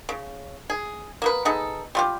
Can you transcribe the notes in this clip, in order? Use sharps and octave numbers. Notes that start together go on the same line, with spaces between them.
C#3
G#4
A#3 B3 B4
B3 D#4 G#4 A4
G3 F4 G4